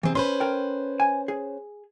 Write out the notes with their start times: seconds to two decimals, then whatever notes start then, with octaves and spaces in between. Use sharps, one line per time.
0.03 C3 E3 C4 G#4
0.15 C#4 B4 C5 B5 C6
0.40 A#4 G5
1.00 G#5
1.28 G#4